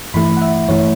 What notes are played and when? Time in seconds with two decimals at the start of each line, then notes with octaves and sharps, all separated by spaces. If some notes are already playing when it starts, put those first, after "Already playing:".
0.14 G2 E3 A3 E4 B5
0.37 F#5
0.42 E5
0.68 G2 E3 A3 E4 C#5